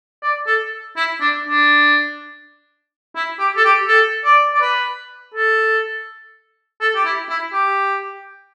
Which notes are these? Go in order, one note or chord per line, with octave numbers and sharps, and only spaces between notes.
D5
A4
E4
D4
D4
E4
G4
A4
G4
A4
D5
D5
B4
A4
A4
G4
E4
E4
G4